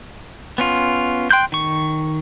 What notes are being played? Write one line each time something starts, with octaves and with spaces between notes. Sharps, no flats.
B3 C#4 F4
G5 C6 F#6 G6
D#3 C#6